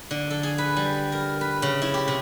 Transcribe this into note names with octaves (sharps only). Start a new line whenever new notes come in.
D3
A4
G#4
B4
G3
A#4
B4
C#3
E4
G4
C3